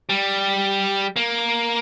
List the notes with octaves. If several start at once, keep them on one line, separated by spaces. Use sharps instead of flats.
G3
A#3